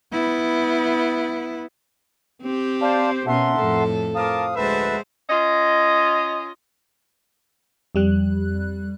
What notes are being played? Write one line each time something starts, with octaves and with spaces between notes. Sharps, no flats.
B3 E4
C4 G4
C5 D5 F5 A5
B2 C#4 A#4 E5 F#5 A5 C6
F2 A2 A4
F3 A#4 F5 A5 D6 D#6
D2 G#3 B4 C5 E5 F#5 A5
C#4 F4 D#5
F2 G3 F#6